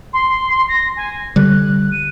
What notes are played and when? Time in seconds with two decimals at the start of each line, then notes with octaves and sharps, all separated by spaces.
0.13 C6
0.68 A#6
0.96 G#5
1.36 D3 G3 F#6
1.91 D#7